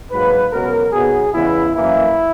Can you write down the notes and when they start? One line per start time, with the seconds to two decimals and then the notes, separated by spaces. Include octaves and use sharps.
0.11 G#2 F#3 A#3 B4
0.52 C#2 B2 F#3 B3 A#4
0.92 B1 B2 F#3 B3 G#4
1.34 E2 C#3 G#3 B3 E4
1.75 F#2 E3 A#3 E4